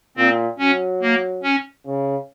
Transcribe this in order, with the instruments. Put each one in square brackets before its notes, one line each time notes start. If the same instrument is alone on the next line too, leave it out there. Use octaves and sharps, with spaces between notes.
[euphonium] A#2 [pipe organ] C4
[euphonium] F#3 [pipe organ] C#4
[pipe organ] A#3
C#4
[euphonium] C#3